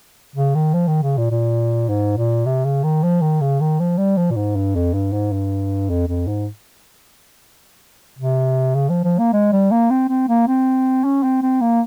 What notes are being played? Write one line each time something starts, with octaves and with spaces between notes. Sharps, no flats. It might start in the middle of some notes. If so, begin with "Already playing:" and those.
C#3
D#3
F3
D#3
C#3
A#2
A#2
G#2
A#2
C3
C#3
D#3
F3
D#3
C#3
D#3
F3
G3
F3
A#2
G#2
G2
F2
G2
G#2
G2
F2
F2
G#2
C3
C#3
F3
F3
A#3
G#3
G3
A#3
C4
C4
A#3
C4
C#4
C4
C4
A#3